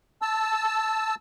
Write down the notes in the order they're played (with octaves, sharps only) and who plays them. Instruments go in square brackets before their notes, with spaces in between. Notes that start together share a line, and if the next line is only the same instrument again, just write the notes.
[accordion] A5 E6